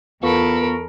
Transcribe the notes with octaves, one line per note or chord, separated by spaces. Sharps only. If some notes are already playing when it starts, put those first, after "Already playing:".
E2 B3 F4 A4 A#4 B5 C#6